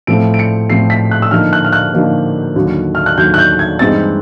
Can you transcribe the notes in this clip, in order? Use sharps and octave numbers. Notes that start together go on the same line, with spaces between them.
A2 F3 A3 C4 D7
D7
C#7
A2 F3 A3 C4 C7
B6
F#6
E6
D3 F3 A#3 D#4 F6
F#6
F6
F#6
D3 F3 A#3 D#4
D#2 D3 F#3
F6
F#6
D#2 D3 F#3 G6
F#6
G6
G#6
G2 E3 G#3 C4 D#4 A6